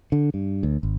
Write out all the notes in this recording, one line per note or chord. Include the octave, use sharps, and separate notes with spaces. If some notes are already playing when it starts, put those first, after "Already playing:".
D3
G2
D2
G#1